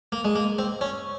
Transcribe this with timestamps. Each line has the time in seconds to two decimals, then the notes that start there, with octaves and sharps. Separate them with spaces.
0.12 A#3
0.25 G#3
0.35 A#3
0.59 C4
0.81 C#4